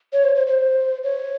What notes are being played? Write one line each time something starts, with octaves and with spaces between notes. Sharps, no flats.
C#5
C5
C5
C5
C#5